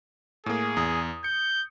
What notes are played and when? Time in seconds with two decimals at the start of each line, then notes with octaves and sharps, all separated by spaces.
0.46 A2 A#3 G#4
0.77 E2 D#6
1.24 G6 C#7